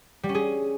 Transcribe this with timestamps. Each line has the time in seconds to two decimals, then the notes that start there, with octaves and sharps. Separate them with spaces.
0.23 G3
0.29 C#4
0.35 G#4